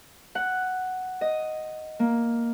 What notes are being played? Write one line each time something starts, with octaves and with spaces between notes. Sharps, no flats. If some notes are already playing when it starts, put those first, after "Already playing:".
F#5
D#5
A#3